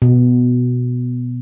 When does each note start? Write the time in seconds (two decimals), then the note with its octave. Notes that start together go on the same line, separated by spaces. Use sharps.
0.02 B2